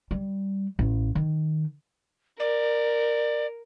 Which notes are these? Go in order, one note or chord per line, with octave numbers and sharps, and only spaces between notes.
G3
A1
D#3
A#4 D5